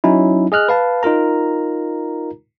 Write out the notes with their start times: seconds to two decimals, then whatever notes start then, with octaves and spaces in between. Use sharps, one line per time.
0.04 F#3 C#4 D#4 E4
0.52 G#4 D#5 F6 F#6
0.69 B4 F5 A5
1.03 D#4 F4 A#4 A#5